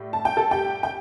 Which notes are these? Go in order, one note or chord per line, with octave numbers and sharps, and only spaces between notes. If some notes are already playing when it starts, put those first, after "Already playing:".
Already playing: A2 G3
A5
G5
A4 A5
G4 G5
G5